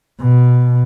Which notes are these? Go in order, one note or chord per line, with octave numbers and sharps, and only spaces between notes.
B2